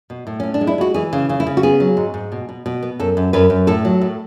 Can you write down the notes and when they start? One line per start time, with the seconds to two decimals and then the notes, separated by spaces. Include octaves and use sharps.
0.10 B2
0.27 A2
0.40 A2 C#4
0.54 D4
0.61 G#3
0.67 E4
0.78 G#3 F#4
0.94 E3 G#4
1.13 C#3
1.29 C#3
1.40 E4
1.47 C#3
1.57 F#4
1.63 B3 G#4
1.80 F#3
1.97 G#2
2.14 G#2
2.32 B2
2.49 B2
2.66 B2
2.83 B3
2.99 F#2 A4
3.17 F#2
3.33 F#2 B4
3.50 F#2
3.67 A2 A4
3.85 F#3
4.02 A2